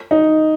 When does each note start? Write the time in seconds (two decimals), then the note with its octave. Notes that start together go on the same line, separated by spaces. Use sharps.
0.11 D#4